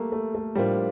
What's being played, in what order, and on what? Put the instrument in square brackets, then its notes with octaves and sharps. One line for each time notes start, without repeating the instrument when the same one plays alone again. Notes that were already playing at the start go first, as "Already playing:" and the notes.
Already playing: [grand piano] G3 A3 A#3
A3
A3
[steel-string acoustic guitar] A2 F3 A#3 D4 F4 [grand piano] G3